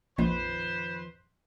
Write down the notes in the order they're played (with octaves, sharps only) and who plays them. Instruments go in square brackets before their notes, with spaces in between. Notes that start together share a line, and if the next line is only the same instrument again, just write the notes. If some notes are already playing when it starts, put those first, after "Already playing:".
[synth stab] A#1 [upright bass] F2 D#3 [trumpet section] B4 C5